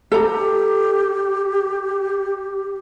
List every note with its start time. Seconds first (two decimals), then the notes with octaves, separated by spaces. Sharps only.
0.12 G4 A4 A#5